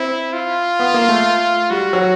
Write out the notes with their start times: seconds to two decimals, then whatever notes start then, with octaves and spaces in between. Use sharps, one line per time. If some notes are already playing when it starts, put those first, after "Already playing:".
Already playing: C4 E4
0.33 F4
0.79 B3
0.94 A#3
1.09 A3
1.70 G3 F#4
1.93 F#3